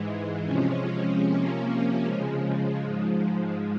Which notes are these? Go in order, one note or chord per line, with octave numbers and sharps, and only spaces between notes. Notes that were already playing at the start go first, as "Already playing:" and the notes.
Already playing: G#2 E3 G#3
C3 F3 G#3 C#4
C3 F3 A#3 C#4
C#3 F3 G#3
G#2 F3 G#3